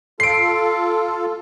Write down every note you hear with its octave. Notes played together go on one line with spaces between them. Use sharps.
F4 A4 C7 D7